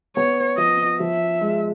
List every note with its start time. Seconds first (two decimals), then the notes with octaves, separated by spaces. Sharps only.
0.16 B3 C#5
0.58 F3 D#5
1.00 F3 E5
1.41 G#3